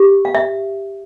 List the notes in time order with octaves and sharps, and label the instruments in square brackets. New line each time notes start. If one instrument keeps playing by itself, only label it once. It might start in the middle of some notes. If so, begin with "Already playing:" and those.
Already playing: [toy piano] G4
F5
E5